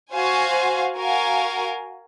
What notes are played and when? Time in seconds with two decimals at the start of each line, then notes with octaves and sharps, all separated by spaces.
0.13 F#4 C5 F5 G#5
0.97 F#4 A#4 F5 G#5